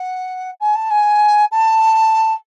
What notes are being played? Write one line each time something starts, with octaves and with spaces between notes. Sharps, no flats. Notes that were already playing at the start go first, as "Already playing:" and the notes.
Already playing: F#5
G#5
A5
G#5
A5